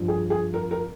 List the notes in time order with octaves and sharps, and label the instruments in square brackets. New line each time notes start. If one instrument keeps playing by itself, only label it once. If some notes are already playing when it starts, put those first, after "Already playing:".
Already playing: [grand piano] G2 F3
G#4
G#4
A#4
A#4